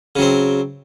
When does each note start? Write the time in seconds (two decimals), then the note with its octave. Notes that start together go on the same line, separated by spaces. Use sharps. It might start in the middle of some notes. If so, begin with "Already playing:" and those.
0.16 C#3
0.19 F#3
0.22 C4